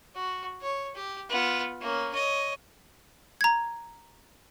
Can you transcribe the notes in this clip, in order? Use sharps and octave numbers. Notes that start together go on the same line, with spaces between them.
F#4
C#5
G4
B3 F4
A#3 C#4
C#5 D#5
A#5 G#6